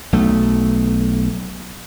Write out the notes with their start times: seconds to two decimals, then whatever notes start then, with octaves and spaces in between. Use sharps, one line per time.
0.13 B1 A3